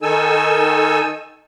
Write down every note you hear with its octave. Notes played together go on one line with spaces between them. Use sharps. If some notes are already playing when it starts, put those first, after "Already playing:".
D#3 D#4 A4 G#5 E6